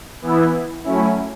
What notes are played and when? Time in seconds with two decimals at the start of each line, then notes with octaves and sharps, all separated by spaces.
0.22 E3 B3 E4
0.84 F#3 A3 C#4 E4